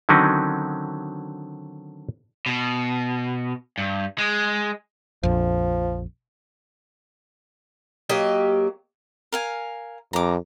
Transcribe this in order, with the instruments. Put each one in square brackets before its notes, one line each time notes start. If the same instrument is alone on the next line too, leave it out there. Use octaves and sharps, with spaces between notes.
[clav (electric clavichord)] D3 D#3 F#3 C4 C#4 D#4
[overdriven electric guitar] B2
G2
G#3
[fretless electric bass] A#1 F2 [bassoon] F3
[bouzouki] F#3 A#3 G4 D#5
[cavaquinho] A#4 F5 G#5
[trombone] F2 [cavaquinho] A#5 D6